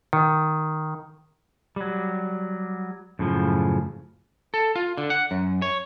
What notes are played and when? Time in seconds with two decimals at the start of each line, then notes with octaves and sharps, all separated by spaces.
0.13 D#3
1.76 F#3 G3
3.19 F#2 A2 C#3 F3
4.54 A4
4.76 F4
4.97 D3
5.10 F#5
5.31 F#2
5.62 C#5